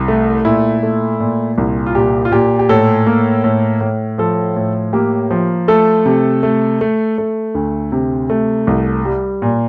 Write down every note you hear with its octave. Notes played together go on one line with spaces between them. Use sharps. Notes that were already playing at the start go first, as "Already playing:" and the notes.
Already playing: C2
A3
A#2 E4
A3
A#2
C2
F4
A#2 G4
F4
A#2 G4
G4
A2 A4
A#3
A2
A2
F3 A4
A2
A#3 G4
F3
A3 A4
C3
A3
A3
A3
D2
C3
A3
C2
G3
A#2